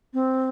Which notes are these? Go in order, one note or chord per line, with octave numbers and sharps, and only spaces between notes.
C4